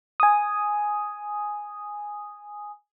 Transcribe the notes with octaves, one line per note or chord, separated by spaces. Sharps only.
G#5 D#6